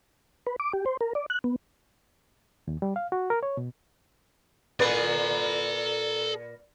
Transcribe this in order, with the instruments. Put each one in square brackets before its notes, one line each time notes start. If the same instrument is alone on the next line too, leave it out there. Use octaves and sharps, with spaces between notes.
[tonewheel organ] B4
D6
G4
C5
A#4
D5
F#6
B3
[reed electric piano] D#2
G3
F5
F#4
A#4
C#5
B2
[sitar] A#2 B4 D5 [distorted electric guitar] A4 G#5